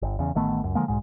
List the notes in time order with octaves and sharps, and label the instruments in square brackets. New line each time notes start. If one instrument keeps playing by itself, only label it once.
[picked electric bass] G1
E2 C#3
A1 D#3 A3 B3
C#2 F#2
D3 F3 G#3 A#3
B1 G#2 G#3